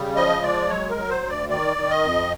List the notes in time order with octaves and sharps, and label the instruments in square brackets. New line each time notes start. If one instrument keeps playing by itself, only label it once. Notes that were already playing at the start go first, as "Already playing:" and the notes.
Already playing: [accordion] C#3 G3
F3 D#5
G#3 D5
F#3 C#5
A#4
F#3
C5
D2
D5
D#3 D5
D#3
D#5
F2